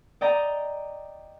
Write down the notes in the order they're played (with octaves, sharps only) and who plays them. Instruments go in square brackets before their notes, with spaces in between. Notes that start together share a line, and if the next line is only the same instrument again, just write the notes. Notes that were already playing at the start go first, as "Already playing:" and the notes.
[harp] D5 D#5 G5 A#5